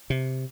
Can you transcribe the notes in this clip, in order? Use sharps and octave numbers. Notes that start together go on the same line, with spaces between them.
C3